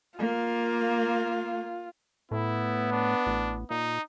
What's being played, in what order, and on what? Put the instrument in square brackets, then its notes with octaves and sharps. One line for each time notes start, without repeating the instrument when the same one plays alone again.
[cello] A#3 [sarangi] F4
[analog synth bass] A2 [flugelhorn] B3 [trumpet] E4
[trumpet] D4
[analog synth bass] A1
[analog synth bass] A#2 [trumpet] D#4